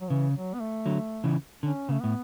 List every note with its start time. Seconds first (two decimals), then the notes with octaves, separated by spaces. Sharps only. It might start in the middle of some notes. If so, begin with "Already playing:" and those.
0.01 F#3
0.10 C#3 E3
0.35 F#3
0.54 B3
0.60 A3
0.86 D3 F#3
1.24 C#3 E3
1.63 D3 C#4
1.89 C#3
1.92 A3
2.01 A2 B3